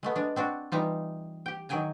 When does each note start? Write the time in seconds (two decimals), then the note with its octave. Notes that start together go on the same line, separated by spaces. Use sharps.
0.03 G#3 A3 B3
0.16 G#3 D4
0.36 C4 D4 F#4
0.72 E3 G3 D#4 F4
1.46 G4 G5
1.69 D#3 F#3 G#4 G5 G#5 A#5